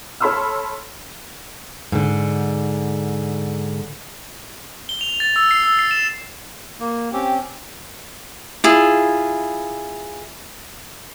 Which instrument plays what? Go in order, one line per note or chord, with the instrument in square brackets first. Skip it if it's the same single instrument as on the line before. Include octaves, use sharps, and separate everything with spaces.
[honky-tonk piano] A4 C#5 B5 C6 E6 F6
[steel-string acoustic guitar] G#2 D3
[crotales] G7
F7
A6
E6
C7
E6
C7
E7
[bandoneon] A#3
[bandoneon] C4 C#4 [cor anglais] G4
[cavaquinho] E4 F4 G#4